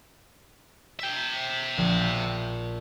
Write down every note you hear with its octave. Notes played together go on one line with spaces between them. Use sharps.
E5 G5
A#1
E7